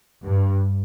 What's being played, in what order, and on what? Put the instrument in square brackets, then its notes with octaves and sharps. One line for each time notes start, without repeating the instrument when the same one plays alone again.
[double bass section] G2